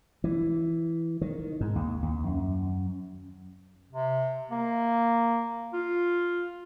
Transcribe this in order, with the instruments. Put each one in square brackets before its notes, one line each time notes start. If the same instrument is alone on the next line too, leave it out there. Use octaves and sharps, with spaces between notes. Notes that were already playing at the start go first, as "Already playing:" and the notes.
[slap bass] E3
D#3
G#2
D#2
D#2
F#2
[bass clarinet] C3
A#3
F4